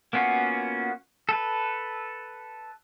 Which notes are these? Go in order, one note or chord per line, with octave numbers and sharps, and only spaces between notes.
A#3 B3 C#4 F4 F#4
A4 B4